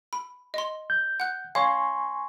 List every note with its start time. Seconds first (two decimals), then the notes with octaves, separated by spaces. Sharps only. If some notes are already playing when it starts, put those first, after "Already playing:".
0.13 B5
0.54 D#5 C6
0.90 G6
1.20 F#5 F#6
1.55 C#5 F5 G#5 C6 C#6